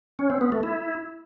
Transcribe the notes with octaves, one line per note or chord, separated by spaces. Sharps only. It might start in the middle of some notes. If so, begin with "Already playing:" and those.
C#4
C4
B3
A3
E4